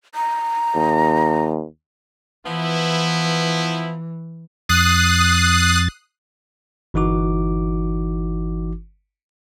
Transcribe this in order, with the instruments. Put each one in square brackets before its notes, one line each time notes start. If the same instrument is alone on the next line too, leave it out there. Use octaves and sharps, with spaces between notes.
[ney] A#5
[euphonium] D#2
[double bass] E3 [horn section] F3 B3 E4
[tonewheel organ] F2 A6 [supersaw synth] D#6 F#6 C7
[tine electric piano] G1 E3 D#4 F#4 D6